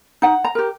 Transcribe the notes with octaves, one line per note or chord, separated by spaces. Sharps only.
D#4 F#5
A#5
G4 A#4